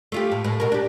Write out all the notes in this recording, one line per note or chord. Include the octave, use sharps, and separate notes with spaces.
A3 F4 G4
A2
A2
B2 A#4
D4 G4